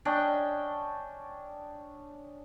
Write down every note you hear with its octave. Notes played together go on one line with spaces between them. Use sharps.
C#4 D4 D#5 G5